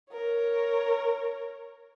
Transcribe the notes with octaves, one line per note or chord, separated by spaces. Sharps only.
A#4 C#5